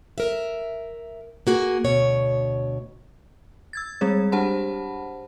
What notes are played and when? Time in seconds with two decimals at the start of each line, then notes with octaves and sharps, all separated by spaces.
0.18 A#4 E5
1.47 A#3 F#4 G#4
1.84 D2 B2 C#5
3.73 E6 G#6 A6
4.01 G3 G#3 C4 G#4 C#5
4.32 D4 G4 C5 F#5 A5 B5